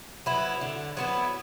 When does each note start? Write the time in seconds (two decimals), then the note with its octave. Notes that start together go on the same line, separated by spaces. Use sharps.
0.26 F#3 B3 E4
0.61 D3
0.97 F#3 B3 E4